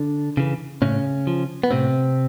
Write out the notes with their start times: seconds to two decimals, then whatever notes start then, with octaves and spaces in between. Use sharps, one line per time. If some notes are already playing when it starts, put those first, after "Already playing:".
Already playing: D3 D4
0.37 C#3 E3
0.82 A2 C#3 C#4
1.27 F3
1.64 B3
1.71 A2 C3 C4